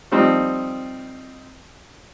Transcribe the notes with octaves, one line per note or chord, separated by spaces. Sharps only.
F3 G3 C4 D#4